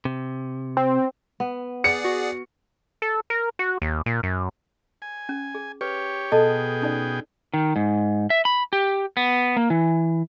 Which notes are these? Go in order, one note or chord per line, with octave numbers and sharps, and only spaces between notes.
C3
C4
B3
G#4 D5 F#5 C#7
F#4
A4
A#4
F#4
D#2
A#2
F#2
G#5
C#4
G#4
G4 B4 C#5
B2 G#4 A4 D#5 G5 A5
C#4 D#4 D5
D#3
G#2
E5
B5
G4
B3
A#3
E3